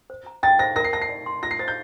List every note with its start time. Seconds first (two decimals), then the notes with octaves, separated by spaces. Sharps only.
0.10 C5
0.26 A#5
0.43 G5 A6
0.59 C5 A#6
0.76 A#4 A#6
0.84 C7
0.93 A5 A#6
1.02 C7
1.09 D5
1.26 C6
1.43 F4 A#6
1.51 C7
1.59 C5 A6
1.68 G6